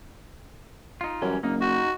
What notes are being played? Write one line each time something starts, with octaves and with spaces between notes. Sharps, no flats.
D#4 F4
F#2 E3 G3 C#4
F#1 A#3 D#4
D#4 F#4